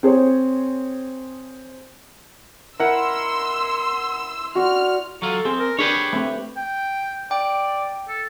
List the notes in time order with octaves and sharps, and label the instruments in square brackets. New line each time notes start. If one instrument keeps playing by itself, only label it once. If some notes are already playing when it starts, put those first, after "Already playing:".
[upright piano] C4 G#4 C5 C#5
[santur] E4 [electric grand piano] A#4 F#5 [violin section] C6 E6
[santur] F#4 D5 C6 [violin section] F6
[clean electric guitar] F#3 F4 [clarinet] A4
[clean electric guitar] C4 [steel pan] G#4
[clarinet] A#4
[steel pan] D4 [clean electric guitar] G4 B4 C#5 [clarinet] G#4
[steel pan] A3 C4
[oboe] G5
[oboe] D5 [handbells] G5
[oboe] A4